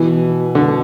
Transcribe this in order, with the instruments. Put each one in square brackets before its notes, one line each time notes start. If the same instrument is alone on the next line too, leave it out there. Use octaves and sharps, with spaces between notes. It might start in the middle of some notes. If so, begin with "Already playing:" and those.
Already playing: [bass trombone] B2 [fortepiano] E3
[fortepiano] D3